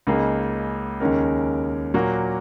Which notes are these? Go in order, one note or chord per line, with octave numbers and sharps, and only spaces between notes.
C#2 C#3 A#3 D#4 G#4
D#2 C#3 G#3 C#4 A#4
A#2 F#3 A#3 F#4